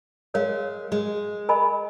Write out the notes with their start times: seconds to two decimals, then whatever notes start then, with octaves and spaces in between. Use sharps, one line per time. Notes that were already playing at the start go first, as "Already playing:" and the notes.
0.34 G#3 A#4 C#5 F5
0.92 G#3
1.49 A#4 D#5 G#5 B5